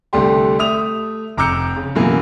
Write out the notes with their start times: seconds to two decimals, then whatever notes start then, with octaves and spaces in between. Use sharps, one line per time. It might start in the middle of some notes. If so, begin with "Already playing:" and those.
0.13 C2 D3 G3 A3 G4 C6
0.59 A3 E5 D#6 F7
1.37 F1 A#5 D6 E6 G6 C#7
1.76 C#3
1.95 F#2 B2 E3 A#3